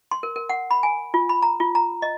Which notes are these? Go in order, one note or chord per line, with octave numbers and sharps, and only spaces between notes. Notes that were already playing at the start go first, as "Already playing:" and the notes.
C6
A#4
A#4
F#5
B5
G#5
F4
B5
A#5
F4
A#5
D#5